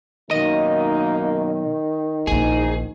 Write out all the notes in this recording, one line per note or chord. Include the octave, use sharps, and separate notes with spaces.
B1 F#2 D#3 A#3 D#4 D#5
A#1 E2 G#2 C#4 D#4 G#4